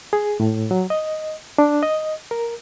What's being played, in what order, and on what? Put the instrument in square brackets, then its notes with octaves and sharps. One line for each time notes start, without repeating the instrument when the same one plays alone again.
[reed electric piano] G#4
A2
F#3
D#5
D4
D#5
A#4